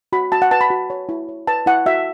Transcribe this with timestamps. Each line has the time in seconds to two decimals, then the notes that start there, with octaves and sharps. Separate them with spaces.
0.13 F#4 B5
0.32 F#4 A5
0.42 F#5
0.51 B4 A5
0.61 B5
0.70 F#4
0.90 C#5
1.09 E4
1.29 C#5
1.47 B4 A5
1.66 E4 F#5
1.86 F#4 E5